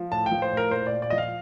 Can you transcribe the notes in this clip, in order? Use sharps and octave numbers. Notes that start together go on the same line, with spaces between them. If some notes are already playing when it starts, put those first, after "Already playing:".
Already playing: F3
A2 A5
G5
F3
C5
A2
A#4
A#2 C5
D5
A#2
D5
F3 D#5
F5